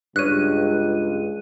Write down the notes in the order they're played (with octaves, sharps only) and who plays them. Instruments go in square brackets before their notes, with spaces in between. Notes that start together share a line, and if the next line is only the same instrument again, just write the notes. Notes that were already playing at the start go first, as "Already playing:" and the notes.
[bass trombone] C#2 [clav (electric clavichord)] G2 C#5 [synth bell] F#6 D#7